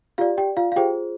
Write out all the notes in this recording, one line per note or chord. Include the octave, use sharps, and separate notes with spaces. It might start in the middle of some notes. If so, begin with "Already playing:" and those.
F4 G4 D5 F5
G4 G5
F4 F5
F5
F4 G4 G#4 C5 G5